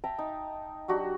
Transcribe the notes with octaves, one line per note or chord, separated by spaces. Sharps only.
E5 G5 A5 A#5
D#4
F#3 D4 F#4 G4